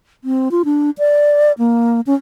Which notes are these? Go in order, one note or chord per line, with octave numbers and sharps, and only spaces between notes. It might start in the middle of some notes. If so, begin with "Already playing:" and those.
C4
F4
D4
D5
A#3
C#4